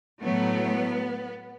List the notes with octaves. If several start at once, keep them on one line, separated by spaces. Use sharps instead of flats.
A2 F#3 A3 B3